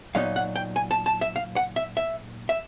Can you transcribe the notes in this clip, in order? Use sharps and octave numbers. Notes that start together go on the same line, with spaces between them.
A#2 F#3 B3 D#4 F5
F#5
G5
G#5
A5
A5
E5
F5
F#5
E5
E5
E5